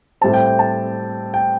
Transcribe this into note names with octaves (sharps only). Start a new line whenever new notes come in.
A2 G3 C4 A5
G5
G5
A5
G5